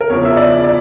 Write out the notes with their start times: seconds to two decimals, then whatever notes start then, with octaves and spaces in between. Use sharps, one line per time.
0.01 A#4
0.10 E2 C#3 F3 C#5
0.25 E5
0.37 D5
0.64 D5